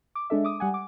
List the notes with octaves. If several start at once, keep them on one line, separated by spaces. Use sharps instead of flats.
D6
G#3 D4 A4 E5
D6 D#6
G3 F#5 G#5
D6